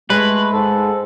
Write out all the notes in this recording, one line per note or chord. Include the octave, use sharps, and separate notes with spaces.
G#3 A3 B4
G#2 A4